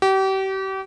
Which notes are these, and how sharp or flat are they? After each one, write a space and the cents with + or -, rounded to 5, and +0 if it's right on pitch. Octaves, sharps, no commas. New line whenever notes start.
G4 -35